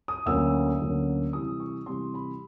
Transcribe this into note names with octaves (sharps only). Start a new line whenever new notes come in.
D#6
D2 D3 F#3 A#3 C#4 E6
D2 D3 F#3 A#3 C#4
C3 E3 G3 D#6
C#6
C3 E3 G3 C6
B5